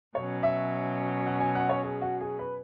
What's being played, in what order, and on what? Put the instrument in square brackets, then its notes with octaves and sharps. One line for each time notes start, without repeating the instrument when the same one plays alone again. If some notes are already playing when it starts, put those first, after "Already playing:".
[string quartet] B2 F#3 C#4 [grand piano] C#5
[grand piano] E5
F#5
G#5
F#5
C#5
G#4
F#4
G#4
B4